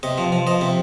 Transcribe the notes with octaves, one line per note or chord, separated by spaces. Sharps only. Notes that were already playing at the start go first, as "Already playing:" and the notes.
C3 D#5
F3
F3
F3 D#5
C3